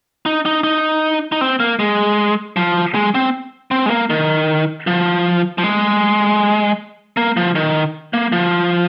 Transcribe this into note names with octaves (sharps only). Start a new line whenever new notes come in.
D#4
D#4
D#4
D#4
C4
A#3
G#3
F3
G#3
C4
C4
G#3
A#3
D#3
F3
F3
G#3
A#3
F3
D#3
A#3
F3